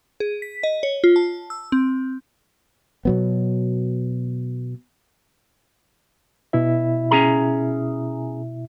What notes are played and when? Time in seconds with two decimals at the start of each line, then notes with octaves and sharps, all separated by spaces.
0.20 G#4
0.42 B6
0.63 D#5
0.83 C#5
1.04 F4
1.16 A5
1.50 E6
1.72 C4
3.05 B2 F#3 B3
6.53 B2 E4 E5
7.11 C#4 G#4 A#5